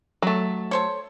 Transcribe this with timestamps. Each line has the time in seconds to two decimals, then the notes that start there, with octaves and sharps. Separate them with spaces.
0.22 F#3 A3
0.71 A4 C5 C#5